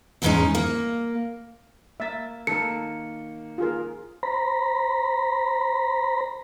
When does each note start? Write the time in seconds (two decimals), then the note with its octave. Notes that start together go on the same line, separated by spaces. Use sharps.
0.22 E2 G#2 D#3 G#3 C#4 D#4
0.55 A#3
2.00 A#3 E5 A6
2.47 D#3 A#3 A4 C#7
3.58 F4 G#4 A#4
4.23 C5 A#5 B5